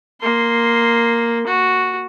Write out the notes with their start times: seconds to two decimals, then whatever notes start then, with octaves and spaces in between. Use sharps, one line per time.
0.21 A#3 C6
1.47 F#4